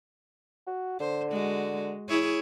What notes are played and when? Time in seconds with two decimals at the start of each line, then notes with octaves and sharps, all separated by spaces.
0.67 F#4
1.00 D3 C5
1.31 G#3 F#4
2.09 E4 G#4 C#5